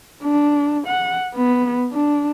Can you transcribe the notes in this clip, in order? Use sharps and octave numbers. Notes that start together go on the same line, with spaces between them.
D4
F#5
B3
D4